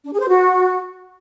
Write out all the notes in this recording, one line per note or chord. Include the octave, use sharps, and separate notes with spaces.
D4
G#4
C5
F#4